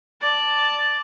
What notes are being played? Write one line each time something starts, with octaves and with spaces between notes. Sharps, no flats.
D5 A5